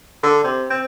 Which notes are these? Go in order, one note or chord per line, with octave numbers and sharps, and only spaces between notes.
D3
C3
C4